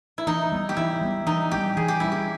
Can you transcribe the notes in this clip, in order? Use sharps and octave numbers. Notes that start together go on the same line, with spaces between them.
E4
E3 D#4
G3 B3
G4
E3 E4
G3 B3
E3 D#4
G3 A#3 C#4 G4
E3 G#4
G4
G3 A#3 C#4 E4
G4